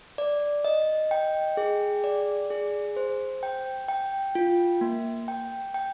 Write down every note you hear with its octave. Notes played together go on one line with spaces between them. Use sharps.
D5
D#5
G5
G#4
D5
G#4
C5
G5
G5
F4
A#3
G5
G5